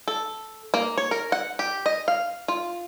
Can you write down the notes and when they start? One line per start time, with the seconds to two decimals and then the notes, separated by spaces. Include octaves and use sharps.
0.08 A4
0.74 A#3
0.98 C#5
1.11 A#4
1.32 F#5
1.59 G4
1.86 D#5
2.08 F5
2.48 F4